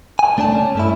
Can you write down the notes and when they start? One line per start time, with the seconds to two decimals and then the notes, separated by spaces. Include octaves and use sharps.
0.19 G#5
0.37 C#2 A3 D4 D5 A5
0.54 C#4
0.75 G2 A3 E4